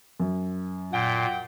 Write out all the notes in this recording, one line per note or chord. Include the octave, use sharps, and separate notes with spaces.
F#2
A#2 F#5 G5